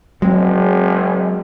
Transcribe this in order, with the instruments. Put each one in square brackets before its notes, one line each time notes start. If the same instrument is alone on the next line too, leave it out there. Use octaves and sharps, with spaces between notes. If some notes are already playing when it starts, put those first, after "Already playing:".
[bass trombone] F#1 [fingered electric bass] F#3 [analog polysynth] G#3 C4